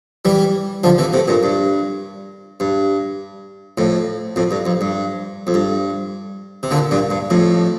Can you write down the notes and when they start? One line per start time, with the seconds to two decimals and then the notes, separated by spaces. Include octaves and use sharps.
0.25 E3 G3
0.84 D3 F3
0.98 C3 E3
1.13 A2 C3
1.28 G2 A#2
1.43 G2
2.60 G2
3.78 F2 A2
4.36 F2 A2
4.51 G2
4.66 F2
4.81 G2
5.47 F2
5.54 G2
6.63 C3
6.71 A#2 D3
6.91 G2 A#2
7.10 G2
7.30 F2 A2